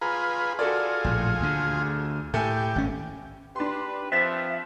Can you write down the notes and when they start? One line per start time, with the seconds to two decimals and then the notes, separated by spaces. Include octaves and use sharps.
0.01 F4 G#4 B4 A#5
0.59 F4 F#4 G#4 A4 D5
1.04 A#1 A2
1.40 D2 D3
2.34 A2 A3 G4 G#5
2.76 G#1 C#4
3.56 D4 G4 B4 C6
4.12 F3 C4 E5 F#6 A6 E7